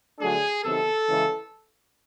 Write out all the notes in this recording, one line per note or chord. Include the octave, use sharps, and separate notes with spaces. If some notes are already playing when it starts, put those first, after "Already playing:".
D3 F#3 A3 D4 G#4
C3 D#3 F#3 B3 A4
C#3 E3 G#3